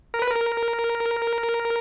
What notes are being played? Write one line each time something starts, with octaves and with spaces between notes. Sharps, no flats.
A#4
B4
A#4